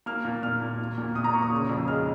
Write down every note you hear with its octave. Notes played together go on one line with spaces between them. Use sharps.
A#3 F6
A#2
A#2 F6
A#3
A#3
A#2
A#2 D#6
A#5
A#3 C#6
D#6
C#3
F2
G#3 F6